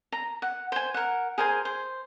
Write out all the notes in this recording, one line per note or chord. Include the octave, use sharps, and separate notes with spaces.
A#5
F#5
C5 G#5
A#4 F#5
G#4 A#4 C5 G#5
C5